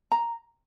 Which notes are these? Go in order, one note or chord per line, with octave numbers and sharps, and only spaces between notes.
A#5